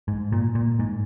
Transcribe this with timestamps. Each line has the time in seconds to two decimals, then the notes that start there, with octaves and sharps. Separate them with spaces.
0.08 G#2
0.32 A#2
0.55 A#2
0.79 G#2